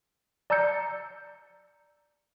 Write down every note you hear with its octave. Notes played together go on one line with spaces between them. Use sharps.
D5 A5 A#5 E6 G6 C#7